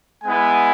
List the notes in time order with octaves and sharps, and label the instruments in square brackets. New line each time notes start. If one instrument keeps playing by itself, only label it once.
[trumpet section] G#3 B3 E4 G#5